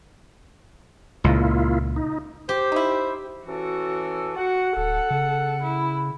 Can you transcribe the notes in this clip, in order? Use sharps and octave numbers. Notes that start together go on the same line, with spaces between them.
C#2 A#2 A#3 E4 F4
D#4
G4 C5
D#4 E4
E3 C#4 F#4 A4
F#4 F#5
D1 A4
C#3
E4